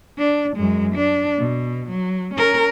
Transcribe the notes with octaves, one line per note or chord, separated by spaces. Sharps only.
D4
F#2 G#3
D4
B2
F#3
C#4 A#4